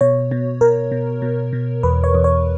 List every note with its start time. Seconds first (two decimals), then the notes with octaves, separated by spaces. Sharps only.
0.01 B2 C#5
0.31 B2
0.61 B2 A#4
0.92 B2
1.22 B2
1.53 B2
1.83 E2 B4
2.04 C#5
2.14 E2
2.24 C#5